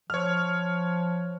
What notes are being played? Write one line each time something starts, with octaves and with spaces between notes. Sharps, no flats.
F3 C#5 F6